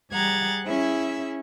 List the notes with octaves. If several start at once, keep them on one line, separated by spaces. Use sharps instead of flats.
G3 G#4 F#5 A#5 G#6 A6
C#4 E4 G#4 E5